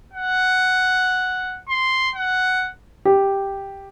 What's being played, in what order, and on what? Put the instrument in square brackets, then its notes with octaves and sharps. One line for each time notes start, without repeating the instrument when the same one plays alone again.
[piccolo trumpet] F#5
C6
F#5
[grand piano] G4